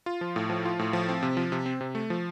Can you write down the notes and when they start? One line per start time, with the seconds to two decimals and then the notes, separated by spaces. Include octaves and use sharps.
0.06 F4
0.21 F3
0.36 A2
0.50 F3
0.65 F4
0.79 A2
0.93 F3
1.09 C4
1.23 C3
1.37 F3
1.52 C3
1.66 C4
1.81 C3
1.95 A3
2.10 F3